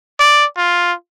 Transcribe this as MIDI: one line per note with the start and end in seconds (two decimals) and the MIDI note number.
0.20 0.45 74
0.57 0.92 65